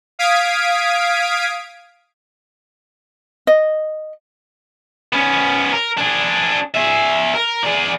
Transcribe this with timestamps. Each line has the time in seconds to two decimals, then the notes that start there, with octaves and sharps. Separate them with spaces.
0.19 F5 D#6 G#6 B6 D7
3.47 D#5
5.13 B3 C#4
5.73 A#4
5.97 D4 G#4
6.74 G#4 E5
7.34 A#4
7.63 G#4 D5